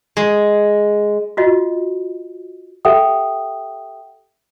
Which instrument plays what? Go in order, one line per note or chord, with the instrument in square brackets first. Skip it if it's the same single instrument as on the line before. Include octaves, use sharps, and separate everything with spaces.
[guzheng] G#3
[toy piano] F4 F#4 D#5
[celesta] G4 A4 E5 F#5 G5 D#6